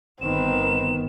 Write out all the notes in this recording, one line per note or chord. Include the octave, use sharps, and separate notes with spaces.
G1 D#3 B3 C4 B4 E7